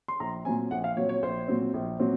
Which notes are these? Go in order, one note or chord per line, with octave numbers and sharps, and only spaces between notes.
C6
A#1 A#5
A#2 F#3 C4 G#5
A#1 F#5
F5
A#2 F#3 C4 C#5
C#5
A#1 C5
A#2 F#3 C4
A#1
A#2 F#3 C4